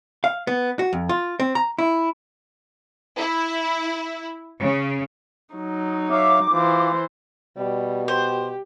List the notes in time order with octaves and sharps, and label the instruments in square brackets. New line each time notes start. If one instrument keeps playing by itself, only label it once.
[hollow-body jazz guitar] F5
B3
F#4
F2
F4
C4
A#5
E4
[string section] E4
C#3
[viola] F#3 D#4
[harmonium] C#5 E5 F5 [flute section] D6
[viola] E3 C5 [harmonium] F4
[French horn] B2 [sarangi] G3
[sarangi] G4 [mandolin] C5